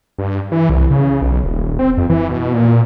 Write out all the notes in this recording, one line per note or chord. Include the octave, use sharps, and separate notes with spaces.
G2
E3
C2
C#3
B1
D#1
C4
F2
E3
B2
A#2